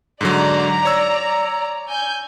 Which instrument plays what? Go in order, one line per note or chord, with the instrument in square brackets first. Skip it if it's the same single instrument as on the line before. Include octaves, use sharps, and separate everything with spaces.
[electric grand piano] G#2 D3 F#3 [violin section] D5 A#5
[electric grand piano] C#5 E6
[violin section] G#5 G6